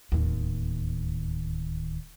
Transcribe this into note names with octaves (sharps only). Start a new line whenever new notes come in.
D1 D#2